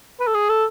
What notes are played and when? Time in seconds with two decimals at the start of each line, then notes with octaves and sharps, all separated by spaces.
0.20 B4
0.27 A4
0.34 G#4
0.49 A4